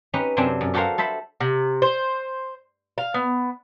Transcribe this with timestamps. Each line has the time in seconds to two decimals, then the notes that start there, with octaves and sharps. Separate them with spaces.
0.13 C#4 D#4 G4 B4
0.37 F#2 C3 C4 D4 G5 G#5
0.61 F#2
0.74 F#4 G4 A4 A#4 C5 F5
0.98 A4 C5 E5 B5
1.40 C3
1.82 C5
2.98 F5
3.14 B3